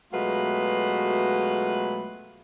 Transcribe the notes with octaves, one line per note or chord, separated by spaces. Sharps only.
B2 F#3 G#3 A3 F4 B4